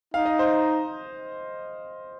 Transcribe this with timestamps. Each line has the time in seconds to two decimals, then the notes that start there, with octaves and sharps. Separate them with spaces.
0.14 D#4 F5
0.26 D#5
0.39 C5